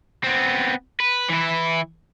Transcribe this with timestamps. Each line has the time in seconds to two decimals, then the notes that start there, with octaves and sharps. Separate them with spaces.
0.24 B3 C4
1.00 B4
1.29 E3 E4